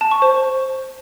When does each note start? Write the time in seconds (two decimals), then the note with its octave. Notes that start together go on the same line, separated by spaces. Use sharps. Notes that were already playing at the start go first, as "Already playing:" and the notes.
0.01 A5
0.11 C#6
0.22 C5